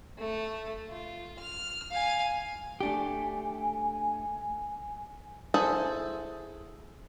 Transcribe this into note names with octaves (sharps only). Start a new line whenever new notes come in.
A3
F4
F6
F5 G#5
A3 D4 G4 G#5
E4 G#4 A4 C5